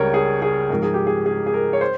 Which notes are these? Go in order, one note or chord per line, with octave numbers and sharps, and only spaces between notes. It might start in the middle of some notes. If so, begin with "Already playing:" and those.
Already playing: C#2 C#3 G3 A#4 C#5
G#4
G#4
G#2 F3 A#4
G#4
G4
G#4
G#4
G#4
A#4
C#5
C5